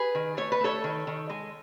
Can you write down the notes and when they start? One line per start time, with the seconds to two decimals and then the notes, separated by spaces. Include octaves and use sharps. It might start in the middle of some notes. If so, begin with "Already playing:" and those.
Already playing: G#4 B4
0.15 D#3
0.37 A3 C#5
0.52 B4
0.61 A3 A4 C#5
0.84 D#3
1.07 D#3
1.30 G#3